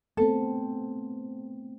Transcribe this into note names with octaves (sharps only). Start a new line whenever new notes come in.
A3 B3 C4 A4